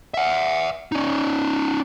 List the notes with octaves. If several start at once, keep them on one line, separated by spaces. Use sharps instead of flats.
E5 F#5
C#4 D#4